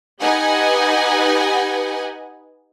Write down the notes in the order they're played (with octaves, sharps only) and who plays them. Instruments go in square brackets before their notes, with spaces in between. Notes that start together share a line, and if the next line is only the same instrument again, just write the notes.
[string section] D#4 G4 B4 D#5 F#5 G#5